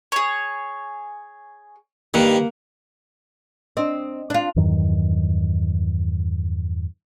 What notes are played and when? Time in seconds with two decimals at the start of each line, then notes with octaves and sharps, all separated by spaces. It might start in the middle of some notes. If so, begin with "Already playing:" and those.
0.12 G#4 C#5
2.14 G2 D#3 A#3 F#5
3.77 C4 D4 D#5
4.30 D4 F4
4.56 E2 G2 D#3 F#3